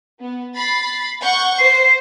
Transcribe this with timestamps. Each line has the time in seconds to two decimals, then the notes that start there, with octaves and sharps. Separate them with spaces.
0.20 B3
0.56 B5 A6 C7
1.22 F#5 C#6 G6
1.59 C5 C7